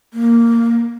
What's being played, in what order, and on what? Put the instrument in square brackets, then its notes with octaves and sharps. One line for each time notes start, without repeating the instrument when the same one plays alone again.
[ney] A#3